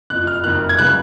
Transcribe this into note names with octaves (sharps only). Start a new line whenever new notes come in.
F#1 F2 F3 F#6
F6
F#1 F2 D#3 F#6
G#6
C#3 F#3 B3 F#6